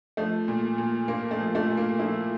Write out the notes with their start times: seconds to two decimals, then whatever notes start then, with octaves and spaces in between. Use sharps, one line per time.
0.17 F3 A3
0.48 A#2
0.78 A#2
1.08 A#2 A#3
1.31 A3
1.39 F3
1.55 A3
1.70 A#2
1.77 A#3
1.99 F3 E4